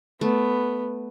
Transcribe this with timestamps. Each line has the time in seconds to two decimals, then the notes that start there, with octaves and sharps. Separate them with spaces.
0.21 A3 B3